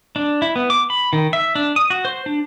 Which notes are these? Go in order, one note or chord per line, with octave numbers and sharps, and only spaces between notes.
D4
E4
B3
D6
B5
D#3
E5
D4
D#6
F#4
C5
D4